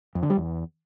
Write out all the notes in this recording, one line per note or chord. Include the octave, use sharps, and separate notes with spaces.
F2
D3
G3
E2